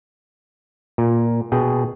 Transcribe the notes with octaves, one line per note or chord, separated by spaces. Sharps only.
A#2
B2 G#4 G5